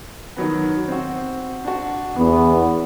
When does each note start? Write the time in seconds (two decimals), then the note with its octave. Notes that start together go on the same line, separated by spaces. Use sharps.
0.37 D#3 F#3 B3
0.87 C4 F#4
1.64 D4 F#4
2.17 E2 B3